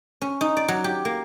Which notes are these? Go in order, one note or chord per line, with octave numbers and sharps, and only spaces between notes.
C#4
D#4
D5
F#3
G4
A#3